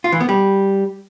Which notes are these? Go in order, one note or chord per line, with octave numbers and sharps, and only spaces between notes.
F4
E3
B3
G3